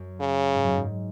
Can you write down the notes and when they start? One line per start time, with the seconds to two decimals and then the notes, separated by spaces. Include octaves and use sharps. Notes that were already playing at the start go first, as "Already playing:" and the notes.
Already playing: F#2
0.20 C#3
0.54 G#2
0.64 F#2
0.76 G#2